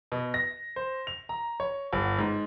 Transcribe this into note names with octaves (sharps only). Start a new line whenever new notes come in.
B2
A#6
C5
F7
A#5
C#5
G1
G#2